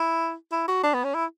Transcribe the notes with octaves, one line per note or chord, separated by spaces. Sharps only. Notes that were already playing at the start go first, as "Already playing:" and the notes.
Already playing: E4
E4
F#4
D4
B3
C#4
E4